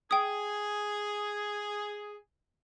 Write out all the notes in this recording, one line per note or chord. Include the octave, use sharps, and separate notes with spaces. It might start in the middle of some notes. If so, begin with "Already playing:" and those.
G#4 G5 D#6